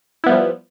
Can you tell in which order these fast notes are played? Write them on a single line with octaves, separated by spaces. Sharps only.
E4 B3 G3 F3